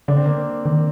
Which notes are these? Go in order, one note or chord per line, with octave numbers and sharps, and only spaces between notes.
D3 D4
C4
A#3
C4
D#3